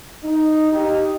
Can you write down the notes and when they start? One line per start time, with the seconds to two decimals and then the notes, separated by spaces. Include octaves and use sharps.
0.24 D#4
0.73 D#4 G4